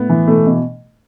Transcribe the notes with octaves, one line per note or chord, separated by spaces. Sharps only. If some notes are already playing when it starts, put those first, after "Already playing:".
Already playing: A2 B3
E3
B2 A3
B2